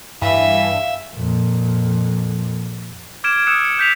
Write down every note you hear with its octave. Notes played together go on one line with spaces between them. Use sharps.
G2 E3 E5 F5
F2 A#2
D6 F6 G#6 D7 E7
D#6 E6 F#6 C#7 E7
C#7
G6 B6 F7